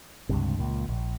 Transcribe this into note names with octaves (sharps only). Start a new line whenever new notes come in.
C#2 G2 C3
C#2 A#2
A#1